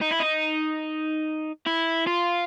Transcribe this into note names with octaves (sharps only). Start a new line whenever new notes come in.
D#4
E4
D#4
E4
F4